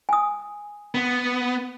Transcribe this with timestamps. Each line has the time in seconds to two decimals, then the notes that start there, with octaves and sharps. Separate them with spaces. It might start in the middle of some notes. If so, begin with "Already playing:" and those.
0.09 G#5 D#6
0.95 B3